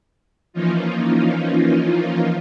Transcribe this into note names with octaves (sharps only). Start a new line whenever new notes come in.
E3 F3 A#3 C#4 D#4 F4